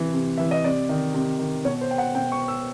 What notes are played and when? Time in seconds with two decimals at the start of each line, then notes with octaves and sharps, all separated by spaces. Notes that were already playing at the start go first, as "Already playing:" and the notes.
Already playing: C3 E3
0.14 C3
0.38 E3 E5
0.51 D#5
0.64 C3 D5
0.89 D#3
1.14 C3
1.39 D#3
1.65 B2 C#5
1.81 C5
1.91 G5
1.98 F#5
2.15 B2 G5
2.32 C#6
2.48 E6